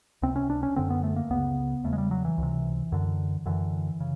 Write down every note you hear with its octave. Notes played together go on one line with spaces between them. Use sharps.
C#2 C3 C4
C#4
D4
C#4
F#2 D3 C4
B3
A3
A#3
C#2 C#3 B3
E2 C#3 A3
G#3
G3
F#3
E3
C#2 C3
F#2 D3
F#2 D3 E3
C#3